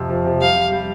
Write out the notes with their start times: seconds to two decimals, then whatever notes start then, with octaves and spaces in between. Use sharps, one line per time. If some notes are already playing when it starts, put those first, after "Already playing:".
Already playing: F2 C3
0.10 F3
0.25 C3
0.40 G3 F5
0.56 G3
0.72 G3